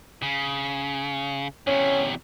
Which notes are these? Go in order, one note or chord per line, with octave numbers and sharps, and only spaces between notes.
C#3
E2 C3 C#4